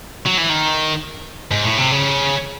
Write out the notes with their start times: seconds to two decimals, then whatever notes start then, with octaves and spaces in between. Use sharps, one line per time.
0.26 F#3
0.38 E3
0.49 D#3
1.51 G#2
1.64 A2
1.78 C3
1.92 C#3